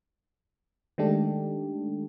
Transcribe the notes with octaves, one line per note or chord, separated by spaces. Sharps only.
D#3 G#3 A3 D4 G4 A4